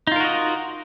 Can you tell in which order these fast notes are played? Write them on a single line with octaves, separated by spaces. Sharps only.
D#4 F4 A#4 F#4 D#5